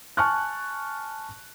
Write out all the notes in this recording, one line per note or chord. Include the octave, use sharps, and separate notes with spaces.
G#5 A5 C#6 F6 F#6